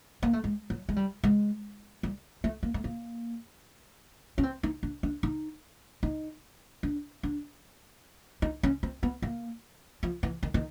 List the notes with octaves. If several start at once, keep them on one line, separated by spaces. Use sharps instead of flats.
A#3
A3
G#3
F#3
G#3
G3
G#3
G3
A3
A#3
A3
A#3
C#4
C4
D#4
D4
D4
D#4
D#4
D4
D4
D#4
C#4
C4
B3
A#3
F3
E3
D#3
D#3